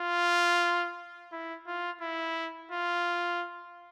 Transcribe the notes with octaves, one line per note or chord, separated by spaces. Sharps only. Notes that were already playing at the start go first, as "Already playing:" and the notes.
Already playing: F4
E4
F4
E4
F4